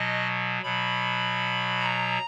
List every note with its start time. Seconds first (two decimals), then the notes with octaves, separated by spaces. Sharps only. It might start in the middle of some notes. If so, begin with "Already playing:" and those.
Already playing: B2 F#3 D#5
0.63 B2 F#3 B5
1.80 A#5